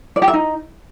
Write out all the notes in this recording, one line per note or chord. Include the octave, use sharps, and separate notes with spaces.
D5
G4
E5
D#4